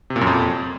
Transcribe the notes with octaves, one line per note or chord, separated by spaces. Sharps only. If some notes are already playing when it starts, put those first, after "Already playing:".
C3
A#2
F#2
F2